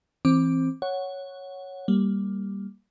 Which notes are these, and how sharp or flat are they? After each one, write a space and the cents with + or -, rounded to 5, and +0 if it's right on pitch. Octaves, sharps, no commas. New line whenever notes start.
E3 -5 C4 +15 D6 +5
C#5 +0 F#5 +0
G3 +0 A#3 +0